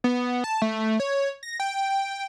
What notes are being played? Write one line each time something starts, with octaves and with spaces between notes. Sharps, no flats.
B3
A5
A3
C#5
A#6
G5